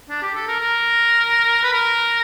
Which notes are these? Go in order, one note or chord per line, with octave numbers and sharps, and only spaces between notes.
D4
G4
A4
A#4
A#4
B4
A#4